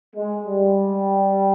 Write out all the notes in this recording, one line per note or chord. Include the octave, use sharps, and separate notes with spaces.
G#3
G3